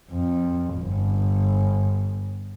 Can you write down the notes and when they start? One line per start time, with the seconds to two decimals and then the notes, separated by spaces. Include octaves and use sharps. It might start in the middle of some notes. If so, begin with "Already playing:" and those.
0.12 F2
0.78 G1